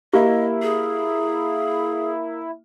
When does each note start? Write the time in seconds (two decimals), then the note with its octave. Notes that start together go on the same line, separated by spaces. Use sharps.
0.13 A#3 E4 G4 D#5
0.62 G#4